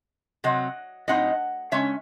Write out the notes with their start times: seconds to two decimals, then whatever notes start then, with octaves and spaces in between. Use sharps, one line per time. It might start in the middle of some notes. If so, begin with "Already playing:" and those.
0.44 C3 F#3 C4 D#5 F#5
1.08 A2 F#3 C4 D#4 D#5 F#5
1.71 C#3 G#3 C#4 C#5 E5